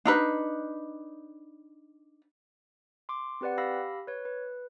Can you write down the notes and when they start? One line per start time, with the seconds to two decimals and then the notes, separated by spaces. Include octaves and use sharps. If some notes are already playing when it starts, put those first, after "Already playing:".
0.05 D4 D#4 B4
3.09 C6 D6
3.41 C4 G4 B4 D5 F#5
3.58 G4 F5 B5 E6 A#6
4.07 B4 C#5
4.25 B4